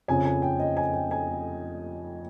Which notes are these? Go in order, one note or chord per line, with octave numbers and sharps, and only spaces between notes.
F2 C#3 F3 G#5
G#5
G5
D#5
G#5
G5
G#5